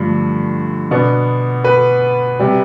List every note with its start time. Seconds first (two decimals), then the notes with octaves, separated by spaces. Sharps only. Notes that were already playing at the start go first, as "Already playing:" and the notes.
Already playing: G2 D3 F3 A3
0.91 B2 B3 D4
1.64 B4
2.39 C3 G3